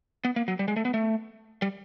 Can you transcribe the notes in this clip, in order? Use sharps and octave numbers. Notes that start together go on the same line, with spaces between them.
B3
A#3
F#3
G3
G#3
A3
B3
A3
G3